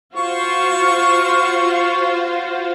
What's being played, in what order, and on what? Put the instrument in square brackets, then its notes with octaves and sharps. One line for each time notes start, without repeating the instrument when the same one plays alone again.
[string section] F4 F#4 C5 [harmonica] C#6